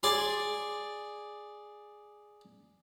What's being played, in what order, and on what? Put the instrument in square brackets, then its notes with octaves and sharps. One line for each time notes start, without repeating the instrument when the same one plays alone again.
[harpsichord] G#4 D5 C6